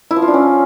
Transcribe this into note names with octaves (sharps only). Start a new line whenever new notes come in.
E4
F3
F4
D4
C#4